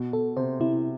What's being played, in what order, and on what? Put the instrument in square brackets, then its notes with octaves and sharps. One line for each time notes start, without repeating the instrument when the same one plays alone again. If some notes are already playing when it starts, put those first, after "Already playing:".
Already playing: [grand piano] B2
[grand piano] B2 [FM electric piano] A4
[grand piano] C3 [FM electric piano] C5
[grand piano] C3 [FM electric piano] E4